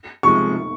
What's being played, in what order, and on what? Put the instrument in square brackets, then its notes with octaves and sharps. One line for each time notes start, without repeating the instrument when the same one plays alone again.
[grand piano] C3 F3 G#3 [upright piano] C#6